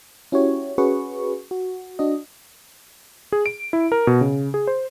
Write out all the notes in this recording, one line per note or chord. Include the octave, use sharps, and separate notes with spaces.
C#4 E4 F#4 G4 C#5
C#4 F#4 G#4 B4 C#6
F#4
D4 F#4 D#5
G#4
D7
E4
A#4
B2
C#3
G#4
C5